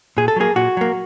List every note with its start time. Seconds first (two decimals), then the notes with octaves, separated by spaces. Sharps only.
0.17 A#2 G#4
0.28 A4
0.36 F#3 A#3 G#4
0.56 A#2 F#4
0.77 F#3 A#3